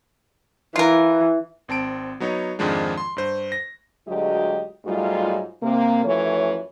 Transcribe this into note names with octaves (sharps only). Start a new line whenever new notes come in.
E3 F4 A#4
G#1 C4 A5 D7
F#3 B3 D#4 C#5
F2 G#2 D#3 F3 G#3 D4
C6
G2 C5
A#6
D2 F#3 G#3 F4 G4 D#5
G#2 F#3 G3 A3 F4
C3 A#3
F#2 E3 F3 A3 C#5